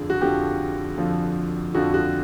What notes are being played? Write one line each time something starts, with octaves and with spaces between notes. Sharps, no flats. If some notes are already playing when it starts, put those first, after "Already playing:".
Already playing: F2 D3 F3 G#4
F#4
F2 D3 F3 G4
F2 D3 F3
F2 D3 F3 F#4
F#4